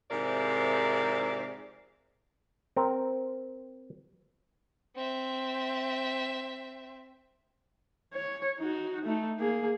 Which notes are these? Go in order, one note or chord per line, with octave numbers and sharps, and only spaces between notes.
G#2 C3 F3 E4 A#4 D5
C4 A#4
C4 E5
C#5
D#4 F#4
A3 D#4
A#3 G#4